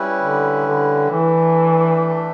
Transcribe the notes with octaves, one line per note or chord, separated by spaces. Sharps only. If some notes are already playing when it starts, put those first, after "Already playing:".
Already playing: G3 C#4 E4 B4
D3
D3
E3 A3 D4 A4